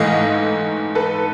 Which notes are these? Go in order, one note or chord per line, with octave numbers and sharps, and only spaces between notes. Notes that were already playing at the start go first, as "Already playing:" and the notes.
Already playing: G#2 E3 A3 D#5 F5
A4 B4